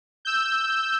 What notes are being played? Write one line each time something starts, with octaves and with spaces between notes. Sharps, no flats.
E6 G6